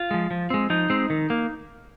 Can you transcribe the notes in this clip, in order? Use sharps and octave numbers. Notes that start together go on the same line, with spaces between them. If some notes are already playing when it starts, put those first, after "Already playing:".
Already playing: F4
F3 G#3
F3
G#3 C4
F3 D#4
G#3 C4
D#3
A#3